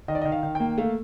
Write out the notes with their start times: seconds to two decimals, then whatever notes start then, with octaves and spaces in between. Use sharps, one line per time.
0.08 D#3 D#5
0.15 D5
0.22 D#5
0.25 D#3
0.32 F5
0.43 D#3
0.55 A#3 G5
0.78 A3 F5